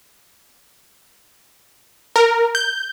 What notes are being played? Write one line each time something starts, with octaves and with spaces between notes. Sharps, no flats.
A#4
G6